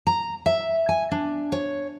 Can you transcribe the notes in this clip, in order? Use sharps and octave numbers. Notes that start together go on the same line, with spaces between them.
A#5
E5
G#5
D4
C#5